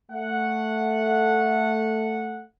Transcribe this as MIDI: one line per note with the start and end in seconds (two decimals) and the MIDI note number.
0.11 2.43 57
0.11 2.43 78